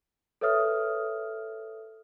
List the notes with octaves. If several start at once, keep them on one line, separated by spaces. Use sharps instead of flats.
A4 B4 C#5 E5 D#6 F6